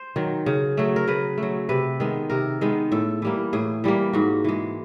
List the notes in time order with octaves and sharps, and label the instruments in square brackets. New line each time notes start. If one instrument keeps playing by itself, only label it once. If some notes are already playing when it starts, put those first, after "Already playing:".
Already playing: [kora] C5
D#3 F#3
C#3
F#3 A3
A#4
C#3 B4
F#3 A3
C3 B4
D#3 G#3 B3
C3 A#4
D#3 G#3 B3
A2 A4
E3 G3 A#3
A2 G#4
E3 G3 A#3
G#2 F#4
E3 G#3